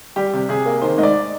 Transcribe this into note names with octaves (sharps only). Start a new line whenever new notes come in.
G3 G4
C3
C3 G#4
A#3
D#3 C5
G#2 D#5
D5